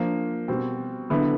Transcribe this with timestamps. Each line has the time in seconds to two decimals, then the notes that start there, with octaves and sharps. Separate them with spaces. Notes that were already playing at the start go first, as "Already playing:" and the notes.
Already playing: F3 A#3 D4
0.48 B2 G3 C4
1.10 D3 F#3 B3 E4